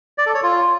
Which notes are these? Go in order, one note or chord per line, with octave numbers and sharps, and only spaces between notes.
D5
A4
C#5
F4